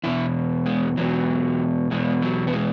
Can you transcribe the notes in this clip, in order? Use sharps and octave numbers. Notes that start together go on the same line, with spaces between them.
E2 B2 E4
G#3
E2 B2 F#3
E2 B2 G#3
F#3
B3
G#3